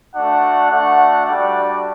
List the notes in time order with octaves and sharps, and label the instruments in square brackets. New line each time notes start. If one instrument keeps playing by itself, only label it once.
[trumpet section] A3 D4 F#4 F#5
A3 D4 F#4 F#5
G3 D4 F#4 D5